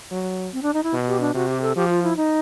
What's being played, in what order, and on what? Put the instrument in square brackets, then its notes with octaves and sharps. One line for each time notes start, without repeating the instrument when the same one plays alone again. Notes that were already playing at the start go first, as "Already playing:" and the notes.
[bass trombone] F#3
[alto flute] C4
D4
D#4
E4
[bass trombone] B2
[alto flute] G4
D4
[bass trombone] C3 [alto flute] F#4
[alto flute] G4
A4
[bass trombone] F3 [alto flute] G4
[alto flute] F4
E4
D#4